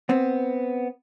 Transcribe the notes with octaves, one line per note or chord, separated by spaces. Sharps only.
B3 C4